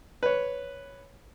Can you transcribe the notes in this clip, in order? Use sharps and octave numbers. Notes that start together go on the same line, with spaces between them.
B4 C#5